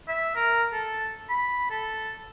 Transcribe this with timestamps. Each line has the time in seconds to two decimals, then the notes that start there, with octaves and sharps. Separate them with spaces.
0.08 E5
0.36 A#4
0.72 A4
1.29 B5
1.70 A4